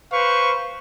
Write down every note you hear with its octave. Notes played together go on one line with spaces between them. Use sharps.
B4 C5 F5 C#6